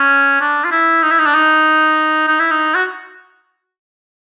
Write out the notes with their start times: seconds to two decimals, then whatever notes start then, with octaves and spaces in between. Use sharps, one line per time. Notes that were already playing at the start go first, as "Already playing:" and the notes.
Already playing: C#4
0.41 D4
0.64 F4
0.71 E4
1.03 D#4
1.11 E4
1.19 D#4
1.26 D4
1.34 D#4
2.28 D#4
2.39 E4
2.51 D#4
2.75 F#4